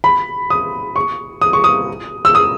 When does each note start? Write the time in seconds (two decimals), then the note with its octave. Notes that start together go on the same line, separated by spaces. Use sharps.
0.04 B5
0.50 D#6
0.96 C#6
1.41 D#6
1.53 C#6
1.64 D#6
2.25 E6
2.35 D#6